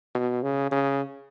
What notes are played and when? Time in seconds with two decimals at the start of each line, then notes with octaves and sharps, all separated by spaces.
0.15 B2
0.43 C#3
0.72 C#3